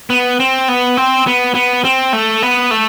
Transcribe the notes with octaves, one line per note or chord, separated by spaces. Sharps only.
B3
C4
B3
C4
B3
B3
C4
A3
B3
A3